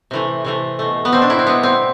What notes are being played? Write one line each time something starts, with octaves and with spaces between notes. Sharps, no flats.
C3 E3 A3
C3 E3 A3
B2 A3
B3
B2 A3 C4
D4
E4
C4
B2 G3 B3
C4